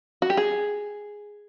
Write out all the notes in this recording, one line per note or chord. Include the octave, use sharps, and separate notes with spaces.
F#4
G4
G#4